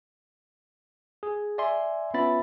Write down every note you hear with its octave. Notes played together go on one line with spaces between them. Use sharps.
G#4
D5 E5 G#5 C6
B3 C#4 F4 E5 B5 A6